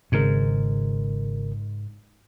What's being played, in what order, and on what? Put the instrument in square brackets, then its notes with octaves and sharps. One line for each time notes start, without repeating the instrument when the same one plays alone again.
[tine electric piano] G#1 C#3 A#4 [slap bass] G#2